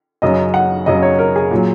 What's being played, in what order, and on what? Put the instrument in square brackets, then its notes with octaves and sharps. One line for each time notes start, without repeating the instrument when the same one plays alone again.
[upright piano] F#2 C#3 F#3 D#5
F#5
F#2 C#3 F#3 D#5
C#5
A#4
G#4
A#2 F#3